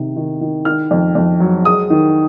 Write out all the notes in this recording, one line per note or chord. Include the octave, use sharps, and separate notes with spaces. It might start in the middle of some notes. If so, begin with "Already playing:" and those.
Already playing: C3 D#3
D#3
D#3
D#3 F6
F2
F2
F#3
G#3 D#6
D#3